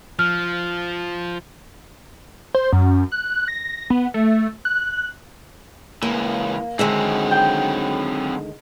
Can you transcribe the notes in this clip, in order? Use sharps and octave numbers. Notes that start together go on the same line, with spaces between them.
F3 F6
C5
F#2
F#6
A#6
B3
A3
F#6
C#2 E3 A#3
D3 D#3 F#3 G#3 C4 E5
G5